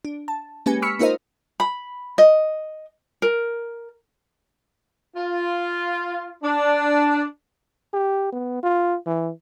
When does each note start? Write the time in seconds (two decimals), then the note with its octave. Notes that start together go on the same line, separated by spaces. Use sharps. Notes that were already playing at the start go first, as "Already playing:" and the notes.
0.05 D4
0.28 A5
0.66 G#3 A#3 C#4 G4 B4 G#5
0.82 B5 C#6 E6 F6 B6 C#7
0.99 A#3 D#4 F4 A#4 C5 D#5
1.60 B5
2.18 D#5
3.22 A#4
5.16 F4
6.43 D4
7.94 G4
8.32 B3
8.63 F4
9.06 E3